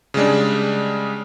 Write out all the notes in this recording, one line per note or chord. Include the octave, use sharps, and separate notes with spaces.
C#3 G3 G#3 D4